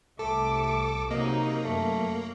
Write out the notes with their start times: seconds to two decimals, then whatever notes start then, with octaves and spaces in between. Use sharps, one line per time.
0.19 C2 A3 A4 D6
1.11 C3 F#3 A#3 D#4 D#5
1.64 F#2 A3